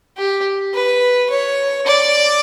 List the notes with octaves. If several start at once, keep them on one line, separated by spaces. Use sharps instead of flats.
G4
B4
C#5
D5